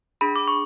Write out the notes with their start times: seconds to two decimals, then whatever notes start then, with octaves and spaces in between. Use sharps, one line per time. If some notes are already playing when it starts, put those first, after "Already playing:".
0.21 D4 G#4 B5
0.36 D6
0.48 C#6